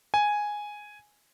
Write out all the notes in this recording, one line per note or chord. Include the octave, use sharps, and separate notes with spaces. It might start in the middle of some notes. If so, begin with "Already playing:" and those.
G#5